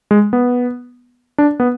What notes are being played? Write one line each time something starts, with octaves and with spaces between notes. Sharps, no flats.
G#3
B3
D4
B3